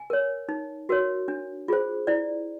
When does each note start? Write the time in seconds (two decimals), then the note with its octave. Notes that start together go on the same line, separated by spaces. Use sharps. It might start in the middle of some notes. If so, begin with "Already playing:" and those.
Already playing: G#5
0.10 A#4 C#5
0.49 D#4
0.89 F#4 A#4 C#5
1.28 D4
1.68 F4 G#4 C5
2.07 E4 D5